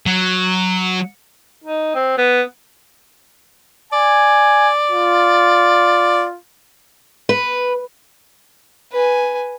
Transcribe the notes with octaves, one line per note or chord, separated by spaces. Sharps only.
F#3
D#4
C4
B3
D5 G#5
F4
B4
B4 G#5